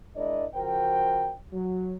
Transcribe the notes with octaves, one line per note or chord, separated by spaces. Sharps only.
G#3 D4 E4 A#4 D5 D#5
C#3 F3 F#4 A#4 C5 G5
F#3